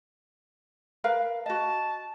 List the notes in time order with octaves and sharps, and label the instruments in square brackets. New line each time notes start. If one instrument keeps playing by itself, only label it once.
[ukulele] A#4 B4 F5
[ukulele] F#4 D#5 [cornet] A5